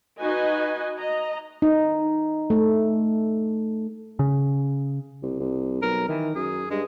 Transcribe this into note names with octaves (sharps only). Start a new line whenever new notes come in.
D#4 F#4 B4 D#5 G#5
D#5 A#5
D#4
A3
C#3
C2
C2
B1 A#4
D#3 E3
F#2 G#4
G2 G#3